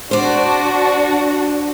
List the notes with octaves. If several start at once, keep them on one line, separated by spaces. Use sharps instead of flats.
D4 F#4 C5 D5